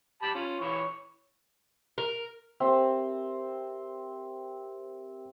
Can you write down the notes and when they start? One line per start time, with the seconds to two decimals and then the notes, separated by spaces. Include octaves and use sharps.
0.22 G4 A5 B5
0.34 C#4 F4
0.61 E3 C#5 C#6
1.98 A#4
2.60 C4 G4 A#4 C5 E5